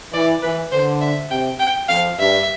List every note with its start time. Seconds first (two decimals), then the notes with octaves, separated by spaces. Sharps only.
0.13 E3 D5
0.42 E3 B4
0.72 D3 C5
1.01 E5
1.30 C3 G5
1.60 G5
1.89 F2 F5
2.19 G2 E5